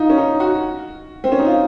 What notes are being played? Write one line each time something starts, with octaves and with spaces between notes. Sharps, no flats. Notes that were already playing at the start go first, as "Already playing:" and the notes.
Already playing: D#4 F4
C#4
D#4
F#4
C4
C#4
D#4
F4